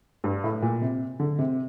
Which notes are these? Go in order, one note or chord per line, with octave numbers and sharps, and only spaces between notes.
G2
A2
A#2
C3
D3
C3